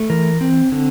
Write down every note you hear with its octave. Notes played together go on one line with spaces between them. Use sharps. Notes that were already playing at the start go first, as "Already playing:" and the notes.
Already playing: A3
E3 A#4
C4
D3